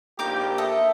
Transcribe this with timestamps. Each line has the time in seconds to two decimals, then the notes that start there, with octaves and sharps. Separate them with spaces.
0.19 A#1 A#3 D#4 G4 G5 D6
0.58 A4 D#5 E5